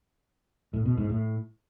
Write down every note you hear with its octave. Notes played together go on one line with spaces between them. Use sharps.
A2
B2
G#2
A2